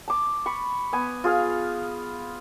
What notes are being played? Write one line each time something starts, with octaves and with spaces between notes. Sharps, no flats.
A5 D6
B5 C#6
B3 G#5
F4 G#4 F5 G#5